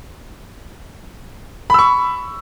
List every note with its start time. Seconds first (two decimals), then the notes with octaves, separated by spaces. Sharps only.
1.70 B5
1.74 E6
1.79 C#6